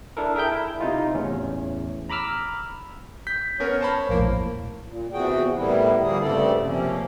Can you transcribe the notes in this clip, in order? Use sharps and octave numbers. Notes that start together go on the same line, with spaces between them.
D4 E4 A4 A#4
G#4 A#4 E5 G5 G6
E4
C3 D#4 F4
E2 A2 C#4
A#5 B5 D6 E6 F6
G6 B6
B3 C#4 A#4 C#5
C5 A5 B5
A#1 E2 A2 A#3
A#2
E2 C3 E3 F#4 G#4 G5
A2 G3 A#3 B3 E4
D3 F3 G3 A#3 G#4
G2 C#3 A3 C4 A4 D5
C3 F3 A#3 C#4